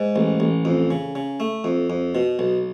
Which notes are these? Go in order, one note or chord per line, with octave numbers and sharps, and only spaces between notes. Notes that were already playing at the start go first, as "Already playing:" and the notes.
Already playing: G#2
A1
A1
F2
C#3
C#3
A3
F2
F2
B2
B1